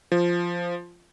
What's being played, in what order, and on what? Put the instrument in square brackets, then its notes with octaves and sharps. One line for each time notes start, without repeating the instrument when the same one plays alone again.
[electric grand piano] F3